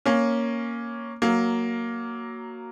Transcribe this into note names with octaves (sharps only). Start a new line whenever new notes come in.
A#3 C#4
F#3 A#3